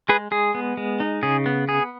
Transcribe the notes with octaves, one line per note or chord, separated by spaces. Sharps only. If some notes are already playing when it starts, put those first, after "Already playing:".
G#3 G#4 B4
G#3 G#4
B3
G#3
D#4
C#3 G#4
B3
B3 G#4